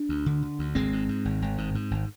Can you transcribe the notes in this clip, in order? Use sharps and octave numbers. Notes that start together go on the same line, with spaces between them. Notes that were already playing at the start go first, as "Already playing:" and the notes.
Already playing: D4
D2
D3
D3
D2
G#1 G#3 C4
G#2
G#2
G#1
G#1
G#2
G#2
G#1